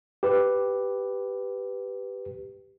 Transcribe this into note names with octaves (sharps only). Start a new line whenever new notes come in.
G4 B4